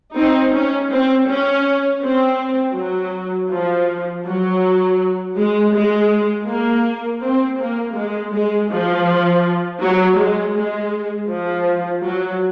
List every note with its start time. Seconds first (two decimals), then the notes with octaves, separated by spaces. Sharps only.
0.16 C4 D#4
0.55 C#4
0.91 C4
1.28 C#4
2.02 C4
2.76 F#3
3.50 F3
4.26 F#3
5.37 G#3
5.74 G#3
6.49 A#3
7.23 C4
7.59 A#3
7.97 G#3
8.34 G#3
8.71 F3
9.83 F#3
10.19 G#3
10.56 G#3
11.31 F3
12.05 F#3